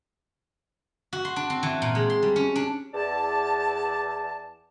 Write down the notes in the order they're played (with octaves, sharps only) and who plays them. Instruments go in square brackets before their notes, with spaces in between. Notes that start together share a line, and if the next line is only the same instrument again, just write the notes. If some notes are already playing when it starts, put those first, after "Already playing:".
[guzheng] F#4
C6
D4
C4
E3
A#2
G#3
C6
G3
C#4
D4
[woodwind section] E2 D5 A5